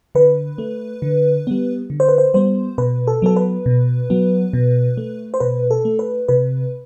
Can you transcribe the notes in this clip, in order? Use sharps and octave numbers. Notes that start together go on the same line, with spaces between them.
D3 B4
A3
D3
G3 B3
D3
C5
B4
C5
G3 B3 C5
B2 B4
A4
F#3 B3 A4
B4
B2
F#3 B3
B2
A3
C5
B2 B4
A4
A3
B4
C3 B4